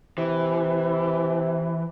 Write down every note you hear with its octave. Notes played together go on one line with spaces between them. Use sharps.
C3 E3